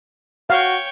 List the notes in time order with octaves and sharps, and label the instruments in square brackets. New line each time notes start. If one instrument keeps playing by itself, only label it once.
[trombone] F#4 [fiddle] C#5 G5 [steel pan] F5